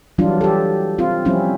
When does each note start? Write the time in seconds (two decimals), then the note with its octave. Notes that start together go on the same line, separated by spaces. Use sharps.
0.18 E3 F#3 G3 D4 F4
0.41 G4 A4
0.98 C4 F4
1.25 F3 G3 C4 C#4 E4